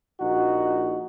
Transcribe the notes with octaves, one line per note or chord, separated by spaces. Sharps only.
A#1 D#4 F#4